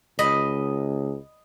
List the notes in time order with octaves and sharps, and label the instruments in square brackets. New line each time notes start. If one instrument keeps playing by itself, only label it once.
[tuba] C#2 [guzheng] D#5 B5